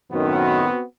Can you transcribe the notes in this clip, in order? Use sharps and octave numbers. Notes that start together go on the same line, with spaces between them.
F#2 A2 D#3 B3 C4 F#4